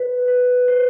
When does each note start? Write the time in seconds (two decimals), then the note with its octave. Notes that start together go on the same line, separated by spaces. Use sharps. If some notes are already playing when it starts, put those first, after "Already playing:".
Already playing: B4
0.28 B4
0.68 C5